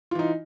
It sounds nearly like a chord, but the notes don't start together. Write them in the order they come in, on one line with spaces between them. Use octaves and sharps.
F4 E3 D#4